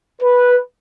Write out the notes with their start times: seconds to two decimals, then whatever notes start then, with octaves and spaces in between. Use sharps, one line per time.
0.22 B4